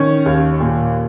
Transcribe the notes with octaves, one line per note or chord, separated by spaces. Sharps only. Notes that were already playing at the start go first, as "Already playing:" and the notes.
Already playing: D#3 C#4 C#5
D#2
A#2